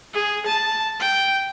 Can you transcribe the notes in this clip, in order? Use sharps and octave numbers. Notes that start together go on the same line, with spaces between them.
G#4
A5
G5